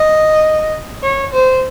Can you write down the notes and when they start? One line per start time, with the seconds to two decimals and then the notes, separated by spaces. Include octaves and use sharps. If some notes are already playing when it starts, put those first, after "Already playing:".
Already playing: D#5
1.03 C#5
1.33 C5